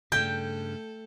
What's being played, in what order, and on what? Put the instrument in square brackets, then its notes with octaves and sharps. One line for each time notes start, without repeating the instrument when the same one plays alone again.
[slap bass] G2 C#3 [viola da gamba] A3 A4 [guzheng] G5 [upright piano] G6